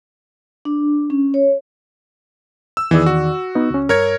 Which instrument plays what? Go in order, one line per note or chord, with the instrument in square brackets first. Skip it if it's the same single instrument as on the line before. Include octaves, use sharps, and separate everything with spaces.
[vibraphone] D4
C#4
C#5
[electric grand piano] E6
[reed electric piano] E2 D#3 D5 [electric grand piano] E3 G#4
[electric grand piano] F#4
[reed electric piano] B3 D#4
C#2 C#4
[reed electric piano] G2 [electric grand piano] A#4 C#5 G#6